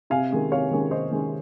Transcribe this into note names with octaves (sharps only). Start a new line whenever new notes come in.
C3 F5 G#5
D#3 G#3 C#4
C3 C#5 F5
D#3 G#3 C#4
C3 C5 D#5
D#3 G#3 C#4